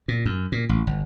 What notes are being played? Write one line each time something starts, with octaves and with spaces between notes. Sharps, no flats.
A#2
F#2
A#2
A1
G1